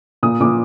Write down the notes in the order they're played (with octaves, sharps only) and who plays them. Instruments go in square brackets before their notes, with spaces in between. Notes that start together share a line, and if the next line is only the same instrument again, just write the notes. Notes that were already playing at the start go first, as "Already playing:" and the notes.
[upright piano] A#2 D#6
A#2 D6